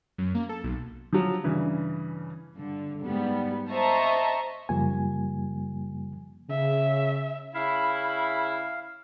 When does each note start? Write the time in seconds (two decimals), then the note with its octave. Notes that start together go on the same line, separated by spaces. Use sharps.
0.18 F#2
0.35 A#3
0.49 A4
0.64 B1
1.13 F3 F#3
1.44 G2 C#3 E3
2.57 G2 D3
3.03 G#2 G3 B3
3.71 C5 D#5 E5 A5 A#5 C#6
4.69 F#2 C#3 F3 G3 A#3 G#5
6.50 C#3 E5
7.54 C#3 E4 F5 B5